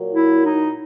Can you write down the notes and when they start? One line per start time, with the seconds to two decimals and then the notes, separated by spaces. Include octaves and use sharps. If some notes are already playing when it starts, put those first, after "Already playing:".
Already playing: A#2 F#3
0.13 E4
0.43 D#4